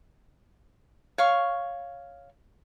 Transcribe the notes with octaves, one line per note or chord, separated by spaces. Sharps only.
C#5 F5 C#6